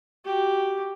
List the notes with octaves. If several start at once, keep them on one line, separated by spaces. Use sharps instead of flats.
F#4 G4